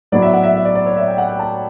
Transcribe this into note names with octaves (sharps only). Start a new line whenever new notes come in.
A2 F#3 B3 D5
E5
F#5
E5
E5
D5
D5
C#5
E5
G5
F#5
G5
A5